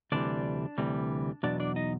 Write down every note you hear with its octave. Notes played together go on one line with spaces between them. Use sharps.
D2 C3 E3 G3 D4 D5
D2 C3 E3 G3
E2 B2 F#3 D4 D5
D4 D5
D#4 D#5